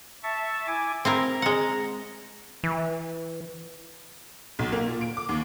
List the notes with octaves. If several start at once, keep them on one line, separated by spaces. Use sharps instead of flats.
E5 A5 C#6
E4 G#5 D6
C4 E4 A#4 A#5
G#3 F#5
E3
B1
A#3
A#2
D7
D6
D#2